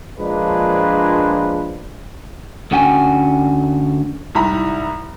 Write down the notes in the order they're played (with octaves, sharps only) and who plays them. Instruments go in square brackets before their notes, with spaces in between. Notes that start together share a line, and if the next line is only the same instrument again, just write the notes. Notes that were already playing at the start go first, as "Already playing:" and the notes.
[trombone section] A#1 F3 G#3 A#3 D4 B4
[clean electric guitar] D2 D3 C#4 F#4 G5 G#5
[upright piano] C2 G#2 E4 G4 A#5 B5